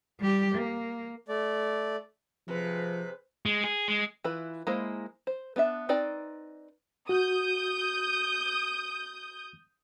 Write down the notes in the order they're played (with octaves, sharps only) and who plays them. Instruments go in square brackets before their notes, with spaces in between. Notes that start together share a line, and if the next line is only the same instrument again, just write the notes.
[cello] G3 G4
A#3
[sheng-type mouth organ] A3 D5
[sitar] C3 [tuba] F3 [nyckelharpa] G#4 B4
[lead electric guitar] G#3
G#4
G#3
[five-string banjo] E3 E4 F4 B4
G#3 A#3 E4 C5
C5
B3 D4 C#5 E5
C4 D#4 B4 D5 G5
[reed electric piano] F#4 [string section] D#6 G6